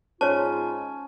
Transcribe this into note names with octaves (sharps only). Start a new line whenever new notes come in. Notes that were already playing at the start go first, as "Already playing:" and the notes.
G#2 C#4 F4 C5 C#5 A5